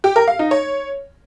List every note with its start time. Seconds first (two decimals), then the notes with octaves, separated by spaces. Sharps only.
0.04 G4
0.16 A#4
0.28 F5
0.39 D#4
0.51 C#5